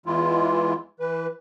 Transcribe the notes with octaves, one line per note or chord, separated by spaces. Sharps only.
E2 E3 G#3 E4 F4
E3 B4